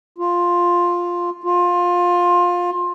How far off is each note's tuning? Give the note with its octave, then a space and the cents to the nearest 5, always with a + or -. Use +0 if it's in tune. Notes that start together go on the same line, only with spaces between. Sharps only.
F4 +5
F4 +20